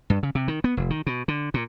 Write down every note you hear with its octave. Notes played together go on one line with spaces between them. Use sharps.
G2
C#3
C3
D#3
B3
F1
D#3
B2
D3
A#2